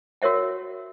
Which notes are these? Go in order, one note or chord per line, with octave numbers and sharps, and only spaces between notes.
F#4 A#4 C#5 E5 F#5